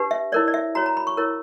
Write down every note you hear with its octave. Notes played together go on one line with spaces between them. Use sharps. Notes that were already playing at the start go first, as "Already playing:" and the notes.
Already playing: D4 G4 B4
E5
E4 A#4 C#5 D5
D5
E5
F#4 C#5 A#5
A#5
B5
C#6
E4 A#4 C#5